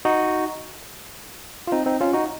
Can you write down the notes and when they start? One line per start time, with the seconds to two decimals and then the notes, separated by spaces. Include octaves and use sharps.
0.05 D#4 F#4
1.67 F4
1.72 C4 D#4
1.86 C4 D#4
2.01 C#4 F4
2.13 D#4 F#4